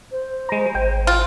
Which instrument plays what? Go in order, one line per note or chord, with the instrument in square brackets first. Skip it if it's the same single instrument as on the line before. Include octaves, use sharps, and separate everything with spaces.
[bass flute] C5
[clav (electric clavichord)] G#3 A#5
[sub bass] G#1 [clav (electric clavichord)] G5
[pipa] F4